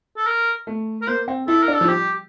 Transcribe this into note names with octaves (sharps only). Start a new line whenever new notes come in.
A4
A#4
A3
A#4
A#3 C5
C4
E4 A4
A#4
D4
A4
F3
G3 G4